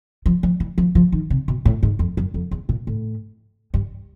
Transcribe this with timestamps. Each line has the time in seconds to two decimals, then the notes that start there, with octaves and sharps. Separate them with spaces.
0.26 F3
0.43 F3
0.60 E3
0.78 F3
0.95 F3
1.12 D#3
1.30 C3
1.48 B2
1.65 A2
1.83 G#2
1.99 F2
2.17 F#2
2.34 F2
2.51 E2
2.69 A#2
2.87 A2
3.74 G2